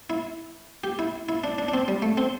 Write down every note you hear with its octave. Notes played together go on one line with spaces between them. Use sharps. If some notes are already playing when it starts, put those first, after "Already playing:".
E4
G4
E4
E4
D4
D4
D4
C4
G3
A3
C4